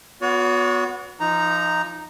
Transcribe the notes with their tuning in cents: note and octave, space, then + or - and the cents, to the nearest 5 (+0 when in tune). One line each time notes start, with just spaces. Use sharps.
B3 +0 F#4 -30 C#5 +40
F3 -30 D#4 +0 A#5 +0